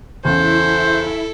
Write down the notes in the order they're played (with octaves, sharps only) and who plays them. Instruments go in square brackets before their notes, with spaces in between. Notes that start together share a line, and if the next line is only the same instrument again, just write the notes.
[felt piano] E2 C#3 [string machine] E4 [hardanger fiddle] A4 [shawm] C5